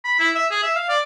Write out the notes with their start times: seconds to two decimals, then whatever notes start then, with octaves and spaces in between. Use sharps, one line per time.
0.04 B5
0.19 E4
0.35 E5
0.51 G#4
0.63 E5
0.76 F5
0.89 D5